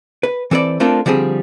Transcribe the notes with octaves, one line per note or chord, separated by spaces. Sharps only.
B4
E3 C4 A4 B4 D5
A3 C4 D4 F4 A4 A#4
D3 F3 G3 C4 G#4